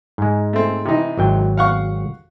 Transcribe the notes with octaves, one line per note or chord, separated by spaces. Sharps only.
G#2 G#3
A3 C4
C3 E3 D#4
G#1 F#3 G5
F5 F#5 C#6